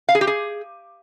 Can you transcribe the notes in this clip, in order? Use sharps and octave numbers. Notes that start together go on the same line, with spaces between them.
F5
G#4
G4
G#4